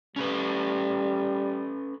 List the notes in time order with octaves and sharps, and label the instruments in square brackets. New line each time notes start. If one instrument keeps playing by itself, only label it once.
[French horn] G3 [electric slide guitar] C#4 A4 B4